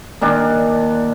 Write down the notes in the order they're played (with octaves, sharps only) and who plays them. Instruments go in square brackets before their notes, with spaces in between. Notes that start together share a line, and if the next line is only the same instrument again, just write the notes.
[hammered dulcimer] A#2 D#3 D4